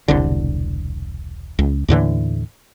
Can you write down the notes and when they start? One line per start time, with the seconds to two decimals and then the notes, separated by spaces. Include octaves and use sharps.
0.08 E1 C2 D3
1.59 C#2
1.88 D#2 A2 D3 E3